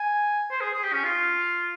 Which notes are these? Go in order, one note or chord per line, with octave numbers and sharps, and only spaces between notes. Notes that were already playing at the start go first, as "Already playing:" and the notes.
Already playing: G#5
C5
G#4
G#4
G4
C#4
F4